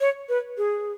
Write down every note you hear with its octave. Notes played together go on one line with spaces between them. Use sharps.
C#5
B4
G#4